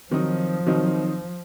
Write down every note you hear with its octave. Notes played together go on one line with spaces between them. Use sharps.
D#3 F3 F#3 C4 D#4
D#3 F#3 C4 D#4